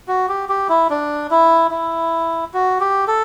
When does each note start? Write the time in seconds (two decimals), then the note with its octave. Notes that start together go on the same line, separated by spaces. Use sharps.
0.08 F#4
0.29 G4
0.49 G4
0.69 E4
0.90 D4
1.31 E4
1.71 E4
2.54 F#4
2.80 G4
3.08 A4